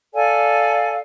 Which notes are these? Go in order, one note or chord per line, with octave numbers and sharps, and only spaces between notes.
A4 D5 F5 G#5